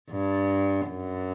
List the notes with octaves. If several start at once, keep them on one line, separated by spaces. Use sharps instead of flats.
G2
F#2